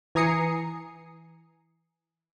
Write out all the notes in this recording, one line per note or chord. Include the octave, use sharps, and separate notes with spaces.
E3 G#5 A#5 D#6 C7 C#7